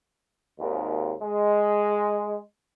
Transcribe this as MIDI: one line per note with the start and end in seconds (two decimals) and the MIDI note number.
0.60 1.13 32
0.60 1.13 39
1.22 2.38 56